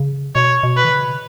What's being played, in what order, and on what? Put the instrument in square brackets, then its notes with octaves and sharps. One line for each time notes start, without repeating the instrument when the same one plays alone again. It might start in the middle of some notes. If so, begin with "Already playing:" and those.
Already playing: [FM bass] C#3
[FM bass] B2 [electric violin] C#5
[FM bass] B2
[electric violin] B4
[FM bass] D#3
C#3